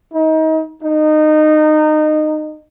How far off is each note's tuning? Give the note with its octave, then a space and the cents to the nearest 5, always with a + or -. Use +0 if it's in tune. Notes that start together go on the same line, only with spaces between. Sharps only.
D#4 +30
D#4 -20